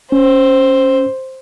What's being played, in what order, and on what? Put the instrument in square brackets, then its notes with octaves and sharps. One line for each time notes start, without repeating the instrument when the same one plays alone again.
[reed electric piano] C#4 [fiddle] C5